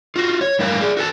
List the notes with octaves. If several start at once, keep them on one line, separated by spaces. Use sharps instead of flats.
F4 F#4
C#5
A2 G3 E4 A#4 F5
G#4 D5
F#4 A4 A5